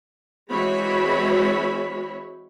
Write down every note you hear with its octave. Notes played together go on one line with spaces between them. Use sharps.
E3 G#3 C4 F#4 C#5 B5